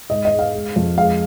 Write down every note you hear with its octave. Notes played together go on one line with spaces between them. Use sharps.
G#2 D#5
D#5
G#3
F5
G#3
F2
G#3 F5